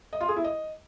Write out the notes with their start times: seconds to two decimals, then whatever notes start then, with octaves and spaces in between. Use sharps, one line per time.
0.13 D#5
0.21 F4
0.28 G#4
0.36 E4
0.44 D#5